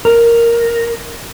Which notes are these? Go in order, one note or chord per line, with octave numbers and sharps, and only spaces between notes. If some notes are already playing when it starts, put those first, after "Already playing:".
A#4